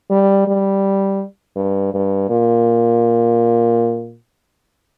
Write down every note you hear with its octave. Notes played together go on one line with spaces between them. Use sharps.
G3
G3
G2
G2
A#2